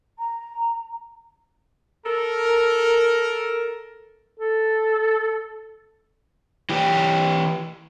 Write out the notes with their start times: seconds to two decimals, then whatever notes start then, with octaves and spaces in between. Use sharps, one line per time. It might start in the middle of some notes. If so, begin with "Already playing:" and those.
0.18 A#5
2.05 A4 A#4
4.39 A4
6.69 E3 G4